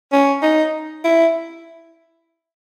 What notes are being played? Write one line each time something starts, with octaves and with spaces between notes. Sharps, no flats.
C#4
D#4
E4